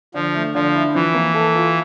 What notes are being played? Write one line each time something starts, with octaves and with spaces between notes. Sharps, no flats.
D3 F3
A3
D3 F3
E4
E3 F3
A#3
A4
F4